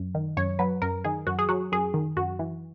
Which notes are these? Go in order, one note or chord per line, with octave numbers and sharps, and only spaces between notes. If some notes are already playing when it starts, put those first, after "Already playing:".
Already playing: F#2
D#3
F#2 C#5
F#3 B4
F#2 A#4
D#3 G#4
F#2 F#4
G#4
F#3 F#4
F#2 G#4
D#3
F#2 F#4
E3